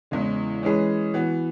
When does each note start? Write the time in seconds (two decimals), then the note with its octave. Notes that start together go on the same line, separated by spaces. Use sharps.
0.11 E2 C#3 E3 G#3
0.63 E3 G#3 C#4 G#4 B4
1.14 E3 B3 F#4